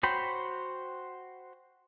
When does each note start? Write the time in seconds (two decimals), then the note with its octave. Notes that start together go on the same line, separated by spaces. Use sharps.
0.03 F#4 C5 C#5 G5 B5